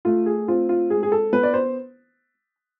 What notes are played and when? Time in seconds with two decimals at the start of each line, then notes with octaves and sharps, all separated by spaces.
0.05 A3 F4
0.26 G#4
0.48 C4 F4
0.69 F4
0.90 G#3 G#4
1.03 G#4
1.12 A4
1.33 B3 B4
1.43 D5
1.54 C5